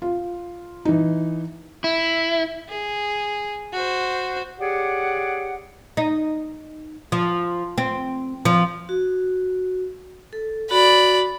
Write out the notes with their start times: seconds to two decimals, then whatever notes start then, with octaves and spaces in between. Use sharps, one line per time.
0.02 F4
0.85 E3 D#4
1.84 E4
2.69 G#4
3.73 F#4 C5
4.59 G4 G#4 C#5 D5 F#5
5.97 D#4
7.12 F3
7.78 C4
8.45 F3
8.89 F#4
10.33 A4
10.71 F#4 D5 B5